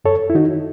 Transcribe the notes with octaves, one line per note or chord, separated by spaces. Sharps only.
F#2 A4 C#5
E4
D#3 D#4 F#4